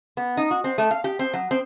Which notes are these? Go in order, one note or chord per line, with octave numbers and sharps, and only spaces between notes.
B3
D#4
F#4
C4
A3
F5
G4
C4
F#3
C4